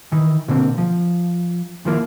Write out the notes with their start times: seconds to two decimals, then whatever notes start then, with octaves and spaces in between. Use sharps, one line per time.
0.12 D#3 E3
0.48 B2 D3 A#3 C4
0.78 F3
1.85 D#3 F3 A#3 E4